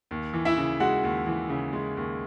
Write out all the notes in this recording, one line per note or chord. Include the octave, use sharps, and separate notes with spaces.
D#2
E3
E4 E5
C#3
G#3 F#4 F#5
D#2
E3
C#3
G#3
D#2